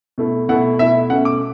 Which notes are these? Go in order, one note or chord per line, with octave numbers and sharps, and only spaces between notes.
B2 A3 E4
B2 A3 E4 F#5
B2 A3 E4 E5
B2 A3 C#4 F#5
D6